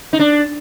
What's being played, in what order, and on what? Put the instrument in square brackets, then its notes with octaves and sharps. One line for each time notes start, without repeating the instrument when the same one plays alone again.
[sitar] D#4
D4